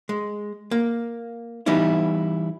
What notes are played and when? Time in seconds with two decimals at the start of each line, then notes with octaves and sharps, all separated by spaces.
0.09 G#3
0.71 A#3
1.66 E3 G3 B3 D#4 E4